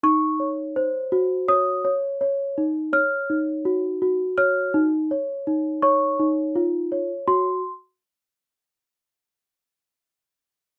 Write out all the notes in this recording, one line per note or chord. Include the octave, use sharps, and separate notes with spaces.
D#4 C#6
C#5
C5
F#4
C#5 D#6
C#5
C#5
D#4
C#5 F6
D#4
F#4
F#4
C#5 F6
D#4
C#5
D#4
C#5 C#6
D#4
F4
C#5
F#4 C6